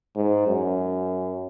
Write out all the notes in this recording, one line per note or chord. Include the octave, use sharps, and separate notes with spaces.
G#2
F#2